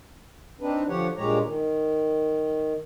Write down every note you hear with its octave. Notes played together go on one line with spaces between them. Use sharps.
C4 D4 D#4 B4
D3 F3 G4 C#5 F#5
G2 A#2 G#3 G4 C#5 A#5
D#3